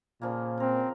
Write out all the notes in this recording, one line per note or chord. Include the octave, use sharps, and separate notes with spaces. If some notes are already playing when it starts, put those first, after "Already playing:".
A#2 C#3 F3 A#3
C4 A#4